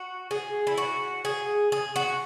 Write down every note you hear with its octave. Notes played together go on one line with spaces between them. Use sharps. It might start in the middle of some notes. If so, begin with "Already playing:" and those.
Already playing: F#4
G#4
E4
F#4
G#4
G#4
F#4